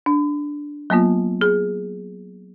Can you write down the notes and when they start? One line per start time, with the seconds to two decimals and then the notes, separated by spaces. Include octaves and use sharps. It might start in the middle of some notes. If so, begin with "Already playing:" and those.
0.06 D4
0.90 F#3 A#3 B3 F4
1.41 G#4